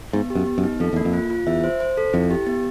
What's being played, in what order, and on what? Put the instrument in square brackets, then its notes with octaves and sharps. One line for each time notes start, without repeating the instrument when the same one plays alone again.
[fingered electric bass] G#2 [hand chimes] B3
[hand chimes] G4
[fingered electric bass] F#2
[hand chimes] B3
[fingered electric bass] F#2
[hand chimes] D#4
[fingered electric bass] F2 [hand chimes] A4
[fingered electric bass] E2 [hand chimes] A#3
[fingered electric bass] F2
[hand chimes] F4
F4
[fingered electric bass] E2 [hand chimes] E5
[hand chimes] C5
C5
A4
[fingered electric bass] F2 [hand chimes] E4
[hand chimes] G4
B3